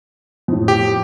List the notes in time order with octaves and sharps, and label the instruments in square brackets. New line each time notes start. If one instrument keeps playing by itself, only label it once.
[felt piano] F2 A2
[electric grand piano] G4